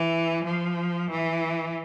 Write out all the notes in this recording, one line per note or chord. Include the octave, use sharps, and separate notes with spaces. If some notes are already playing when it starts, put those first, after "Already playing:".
Already playing: E3
F3
E3